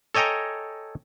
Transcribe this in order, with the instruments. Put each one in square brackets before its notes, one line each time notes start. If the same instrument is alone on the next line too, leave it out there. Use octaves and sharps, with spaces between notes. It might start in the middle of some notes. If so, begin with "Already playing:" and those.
[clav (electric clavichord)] A4 C#5 D#5 G5 G#5 A#5